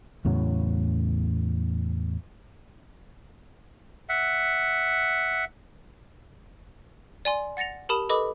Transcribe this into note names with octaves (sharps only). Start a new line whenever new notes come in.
E2 A2 C#3 F#3
E5 F#5
D5 G#5 C6
F#5 A6 A#6 C#7 F7
G4 A#4 A5 B5 D#6 E7
A4 B4 D#5 B5 D6 D#6